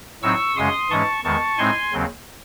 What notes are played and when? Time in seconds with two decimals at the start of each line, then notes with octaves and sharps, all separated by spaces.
0.22 A2 F#3 C4 D#4 C#6 E6
0.56 F#2 C#3 G#3 C#4 C6 D#6
0.90 G#2 E3 G#3 C#4 A5 C#6
1.24 E2 D#3 G#3 A5 C#6
1.58 A2 G#3 C4 D#4 G#5 C6
1.93 D#2 C#3 F#3 C4